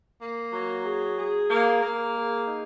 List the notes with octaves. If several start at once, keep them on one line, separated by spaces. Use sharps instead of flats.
A#3
F#3
G#4
G#4
A#3
A#3
G#4
D#4